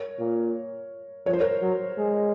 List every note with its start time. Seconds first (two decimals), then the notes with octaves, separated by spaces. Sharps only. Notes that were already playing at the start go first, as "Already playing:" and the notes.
Already playing: A#4 C#5
0.19 A#2
1.26 F3 C#5
1.33 C5
1.40 A#4 C#5
1.62 F#3
1.98 G#3